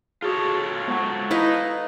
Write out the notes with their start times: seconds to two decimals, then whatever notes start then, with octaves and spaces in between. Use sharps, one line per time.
0.22 F4 F#4 G#4 A4 C#5
0.87 F#3 G#3 B3 C5
1.31 D#4 E4 B4 F5